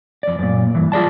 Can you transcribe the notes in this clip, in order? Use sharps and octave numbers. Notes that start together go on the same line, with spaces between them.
F2 D5
F#2 A#2
G2 E3
F4 G#4 D5 A5